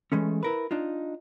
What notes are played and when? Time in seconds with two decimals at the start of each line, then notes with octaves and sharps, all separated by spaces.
0.12 E3 G#3 A3 C#4
0.43 E4 A#4 B4
0.71 D4 D#4 F4